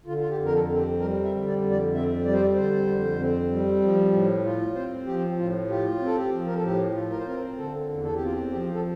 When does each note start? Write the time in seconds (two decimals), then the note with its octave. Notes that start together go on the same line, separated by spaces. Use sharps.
0.06 D3 F4
0.18 F4
0.29 G4
0.37 F2
0.46 A#4
0.53 A4
0.69 C4 A4
0.77 G4
1.00 G3 A#4
1.24 E5
1.31 D3
1.47 D5
1.62 F2
1.71 D5
1.94 C4 E5
2.25 G3 D5
2.33 C5
2.41 D5
2.56 D3 C5
2.87 F2
3.19 C4
3.51 G3
3.82 F3
4.12 A2
4.45 F4
4.75 C4 C5
5.06 F3 G4
5.38 A2 F4
5.69 F4 G4
6.00 C4
6.06 A4
6.16 G4
6.32 F3
6.46 A#4
6.55 A4
6.63 A2 G4
6.95 F4
7.10 A#4
7.18 C5
7.26 C4 A#4
7.57 D3 A4
7.89 E2
8.04 A4
8.14 G4
8.19 C4 F4
8.34 G4
8.50 F3 G4
8.74 A4